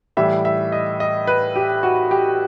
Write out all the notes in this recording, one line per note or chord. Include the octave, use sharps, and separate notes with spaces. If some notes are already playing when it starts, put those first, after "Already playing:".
A2 E3 G3 E5
E5
D#5
D#5
B4
G4
F#4
G4